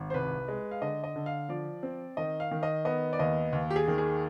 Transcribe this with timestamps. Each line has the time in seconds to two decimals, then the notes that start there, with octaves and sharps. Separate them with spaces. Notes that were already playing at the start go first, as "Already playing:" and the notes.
Already playing: G#1
0.10 C5
0.14 C2 B4
0.48 G#3
0.71 F5
0.82 D3 D#5
1.04 D#5
1.16 D3
1.26 F5
1.49 F3 D5
1.83 C4
2.17 D#3 D#5
2.40 F5
2.51 D#3
2.63 D#5
2.85 B3 D#5
3.13 D5
3.19 D#2 D#5
3.53 D#2
3.71 G4
3.76 G#4
3.88 D#3
3.98 G#4